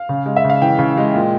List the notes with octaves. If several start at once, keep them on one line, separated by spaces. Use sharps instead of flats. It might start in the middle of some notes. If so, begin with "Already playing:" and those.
Already playing: F5
C#3
G#3
E5
C#3
F5
E3 G5
C#3
G#3
A#2